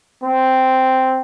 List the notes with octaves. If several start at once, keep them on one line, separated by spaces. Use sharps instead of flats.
C4